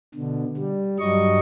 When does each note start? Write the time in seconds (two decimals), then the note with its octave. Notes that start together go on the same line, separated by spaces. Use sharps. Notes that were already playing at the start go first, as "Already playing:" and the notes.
0.15 B2 D3
0.57 G3
0.99 G2 F#3 G3 D#5 C#6